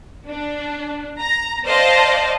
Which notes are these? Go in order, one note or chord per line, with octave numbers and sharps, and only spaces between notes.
D4
A#5
C5 D5 D#5 F5 A5